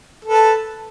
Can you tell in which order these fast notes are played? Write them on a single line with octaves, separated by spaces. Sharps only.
A4 B4 A5